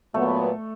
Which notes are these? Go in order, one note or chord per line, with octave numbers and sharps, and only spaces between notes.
A#2 F#3 A3 B3